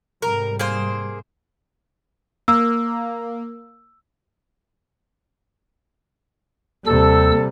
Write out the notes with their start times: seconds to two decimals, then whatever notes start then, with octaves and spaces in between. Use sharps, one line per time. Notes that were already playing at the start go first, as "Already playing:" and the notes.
0.22 G#2 C3 G3 A#4
0.59 A#3 G#4 C5
2.48 A#3 E6
6.87 D#2 C3 G3 A4 E6